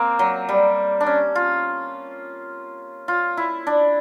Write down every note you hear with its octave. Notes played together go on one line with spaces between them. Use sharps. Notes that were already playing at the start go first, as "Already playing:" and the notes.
Already playing: A#3 C4
F#3
G3
D4
C#4
F4
F4
E4
D4